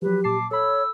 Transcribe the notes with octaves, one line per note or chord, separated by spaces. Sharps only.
F3 F#3 G4 B4
A#2 A5 D6 C7
A4 C#5 B5 E6